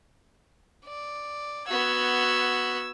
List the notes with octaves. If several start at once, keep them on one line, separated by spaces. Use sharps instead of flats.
D5
B3 F#4 E6 G#6